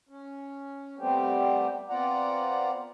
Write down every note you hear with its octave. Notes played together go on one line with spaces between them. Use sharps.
C#4
G3 A3 B3 C4 G4
B3 C4 F4 D5 F#5 A#5